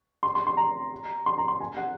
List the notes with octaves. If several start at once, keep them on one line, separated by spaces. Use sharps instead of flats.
C6
C6
C6
A#5
C6
A#5
C6
G#5
F#5